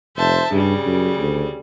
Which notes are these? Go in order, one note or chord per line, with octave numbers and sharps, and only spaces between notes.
F1 C5 E5 A5
G2 C#3 G3
F#2
D2